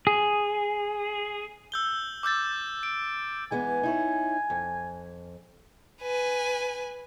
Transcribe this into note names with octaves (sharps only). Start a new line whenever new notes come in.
G#4
E6 G6 G7
D6 E6 G6 A6
D7
E3 G#3 B3 G#5
D#4 E4 C#5
F2
B4 G#5